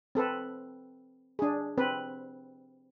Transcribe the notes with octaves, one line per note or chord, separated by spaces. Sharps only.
C4 A4 B4
D4 G#4
C4 B4